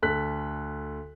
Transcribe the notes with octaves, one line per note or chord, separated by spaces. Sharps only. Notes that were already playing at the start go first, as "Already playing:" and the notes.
D2 A4 F#6 B6